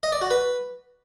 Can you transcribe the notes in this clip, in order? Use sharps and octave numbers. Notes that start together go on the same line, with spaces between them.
D#5
D5
F#4
B4